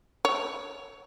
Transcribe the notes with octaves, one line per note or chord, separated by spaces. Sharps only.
C#5